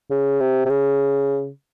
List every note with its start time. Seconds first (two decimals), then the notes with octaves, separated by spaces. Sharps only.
0.10 C#3
0.40 C3
0.66 C3
0.69 C#3